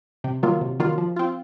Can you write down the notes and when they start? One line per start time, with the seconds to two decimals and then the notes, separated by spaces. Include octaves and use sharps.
0.24 C3
0.43 D#3 F#3 A#3 F4
0.61 C3
0.79 D#3 F#3 A#3 F4
0.98 F3
1.16 C4 F4